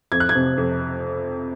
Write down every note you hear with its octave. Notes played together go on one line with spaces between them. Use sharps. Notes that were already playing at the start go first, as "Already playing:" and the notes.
F2 G#6
F#6
G#6
C3
F2